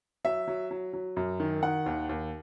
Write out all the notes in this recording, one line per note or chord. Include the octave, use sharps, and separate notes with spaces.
F#3 E5
F#3
F#3
F#3
F#2
D#3
D#3 F#5
D#2
D#2